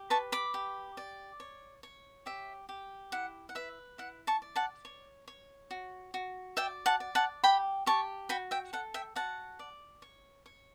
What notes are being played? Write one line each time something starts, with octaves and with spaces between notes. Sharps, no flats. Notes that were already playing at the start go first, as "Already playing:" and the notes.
Already playing: G4
B4 A5 C#6
B5 D6
G4
D5
C#5
C#5
G4 E5
G4
E4 F#5
F#5
B4 E5
E4 F#5
A5 C#6
D5
F#5 A5
C#5
C#5
F#4
F#4
D5 E5 G5
F#5 A5
D5
F#5 A5
G4 G5 B5
G4 A5 C#6
F#4 G5 B5
E5 G5
A4 F#5
E5 G5
F#4 F#5 A5
D5
C#5
C#5